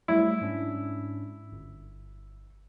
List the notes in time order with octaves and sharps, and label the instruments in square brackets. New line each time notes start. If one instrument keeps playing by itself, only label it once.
[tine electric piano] F#3 G3 A3 [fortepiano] E4
[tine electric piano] G#2 C#4 D4
G1